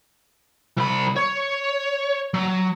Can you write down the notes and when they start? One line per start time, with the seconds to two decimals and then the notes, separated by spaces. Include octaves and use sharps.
0.77 C2 B5
1.16 C#5
2.34 F#3